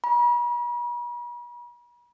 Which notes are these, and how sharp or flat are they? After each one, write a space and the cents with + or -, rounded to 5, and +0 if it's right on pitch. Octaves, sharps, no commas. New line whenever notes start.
B5 -45